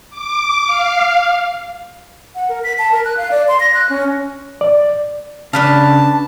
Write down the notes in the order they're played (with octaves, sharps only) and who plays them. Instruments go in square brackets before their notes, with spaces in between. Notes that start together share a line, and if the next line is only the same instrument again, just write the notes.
[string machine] D6
F5
[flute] F#5
A#4
B6
A5
A#4
F#6
F5
D5
C6
A#6
F#6
C#4
[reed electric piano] D5
[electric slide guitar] C#3 [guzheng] D4 B4 F5 [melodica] A5